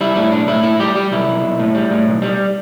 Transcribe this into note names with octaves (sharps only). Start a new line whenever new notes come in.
G3 E4
A2 E4
B1 D4
A2 E4
A2 E4
G3 G4
G3 G4
B1 E4
B1
B1
A2
G3
A2
B1
G3